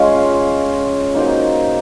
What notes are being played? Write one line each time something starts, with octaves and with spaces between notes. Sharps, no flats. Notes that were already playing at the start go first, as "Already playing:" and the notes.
Already playing: G#3 C#4 F4
A#3 D#4 F#4 C5